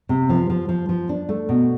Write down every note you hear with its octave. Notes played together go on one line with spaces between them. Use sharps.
C3
F3
F3
F3
F3
D4
A3
B2